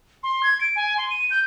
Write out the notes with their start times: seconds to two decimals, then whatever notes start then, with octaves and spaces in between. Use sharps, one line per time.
0.23 C6
0.43 G#6
0.61 D7
0.76 G#5
0.98 C6
1.10 D#7
1.31 G6